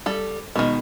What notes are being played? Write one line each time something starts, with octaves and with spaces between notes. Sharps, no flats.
G3 A4
B2 D#3 G#3